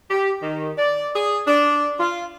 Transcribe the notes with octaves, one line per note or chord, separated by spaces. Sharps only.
G4
D#3
D5
G#4
D4
F4